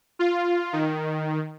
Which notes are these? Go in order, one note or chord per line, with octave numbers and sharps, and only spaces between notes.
F4
D#3